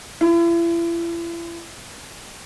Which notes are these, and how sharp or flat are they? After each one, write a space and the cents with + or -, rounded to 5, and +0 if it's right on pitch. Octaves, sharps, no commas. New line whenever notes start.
E4 +40